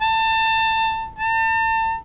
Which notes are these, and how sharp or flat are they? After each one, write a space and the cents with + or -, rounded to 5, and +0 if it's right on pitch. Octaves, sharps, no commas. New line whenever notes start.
A5 +25
A5 +35